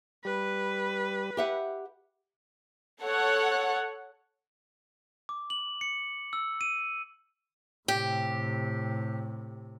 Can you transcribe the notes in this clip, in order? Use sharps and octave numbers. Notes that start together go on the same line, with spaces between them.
G3 G4 B4
G4 E5 F#5
A4 C#5 F#5
D6
F#7
C#7
E6
D#7
A2 C3 G4